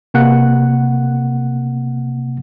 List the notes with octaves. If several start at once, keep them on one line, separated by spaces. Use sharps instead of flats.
C3 A#3 F#5 F#6